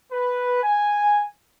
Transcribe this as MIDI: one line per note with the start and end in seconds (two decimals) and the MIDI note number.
0.12 0.59 71
0.63 1.25 80